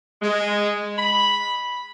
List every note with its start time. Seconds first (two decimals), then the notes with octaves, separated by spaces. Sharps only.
0.22 G#3
0.97 B5